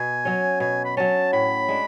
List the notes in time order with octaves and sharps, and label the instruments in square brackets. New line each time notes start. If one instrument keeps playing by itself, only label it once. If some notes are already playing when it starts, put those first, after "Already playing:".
Already playing: [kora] B2 [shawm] G#5
[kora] F#3 C#4
[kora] B2 [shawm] G#5
[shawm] B5
[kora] F#3 C#4 [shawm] A5
[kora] A2 [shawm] B5
[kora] G#3 D4